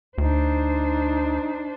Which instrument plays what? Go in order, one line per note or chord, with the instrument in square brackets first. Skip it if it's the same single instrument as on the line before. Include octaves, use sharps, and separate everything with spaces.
[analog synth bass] D2 [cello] D4 C5 [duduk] D#4